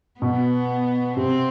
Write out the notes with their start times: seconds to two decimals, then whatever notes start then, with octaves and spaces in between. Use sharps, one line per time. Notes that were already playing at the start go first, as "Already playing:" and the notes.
0.21 B2 B3
1.17 C3 C4